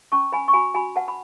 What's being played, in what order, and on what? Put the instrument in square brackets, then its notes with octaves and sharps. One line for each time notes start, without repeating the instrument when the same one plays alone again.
[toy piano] C#4 A5 C#6
B4 G#5 B5
C#6
F#4 G#5 B5
F#4 G#5 B5
B4 F#5 A5
B5